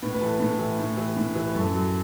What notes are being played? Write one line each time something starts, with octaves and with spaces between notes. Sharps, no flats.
A2 B4
B4
E3 A4
A2 A4
E3
A2
E3
A2
E3
B4
F#2 A4
F#3